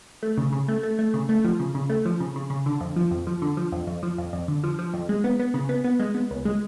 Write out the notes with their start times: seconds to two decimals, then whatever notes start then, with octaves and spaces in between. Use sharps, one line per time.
0.23 A3
0.38 C#3
0.53 C#3
0.68 A3
0.83 A3
0.99 A3
1.14 C#3
1.29 A3
1.44 F3
1.59 C#3
1.75 C#3
1.90 A3
2.05 F3
2.20 C#3
2.36 C#3
2.50 C#3
2.66 D3
2.81 F2
2.96 F3
3.11 F2
3.27 F3
3.42 D3
3.57 F3
3.72 F2
3.87 F2
4.03 F3
4.18 F2
4.33 F2
4.48 D3
4.63 F3
4.79 F3
4.94 F2
5.09 G#3
5.24 B3
5.40 B3
5.54 C#3
5.69 B3
5.84 B3
6.00 G#3
6.15 B3
6.31 C#2
6.45 G#3